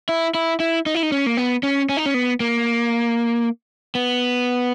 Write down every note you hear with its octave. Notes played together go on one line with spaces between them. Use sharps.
E4
E4
E4
D#4
E4
D#4
C#4
A#3
B3
C#4
C#4
D#4
C#4
B3
A#3
B3